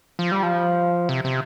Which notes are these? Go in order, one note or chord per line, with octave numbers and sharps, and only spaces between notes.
F3
G3
F3
C3
C3